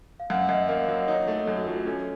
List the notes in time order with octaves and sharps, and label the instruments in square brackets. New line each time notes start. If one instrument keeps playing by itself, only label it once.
[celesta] F5
[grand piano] F#2 [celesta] F#5
[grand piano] F#2 [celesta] D#5
[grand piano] A#3 [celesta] F5
[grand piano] F#3
[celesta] D#5
[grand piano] D#4 [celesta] C#5
[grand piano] A3
[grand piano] F#2 [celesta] A4
[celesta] F#4
[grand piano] A3 [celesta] F4
[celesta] F#4
[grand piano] C#4 [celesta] A4